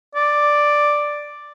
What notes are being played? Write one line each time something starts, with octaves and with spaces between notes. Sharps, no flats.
D5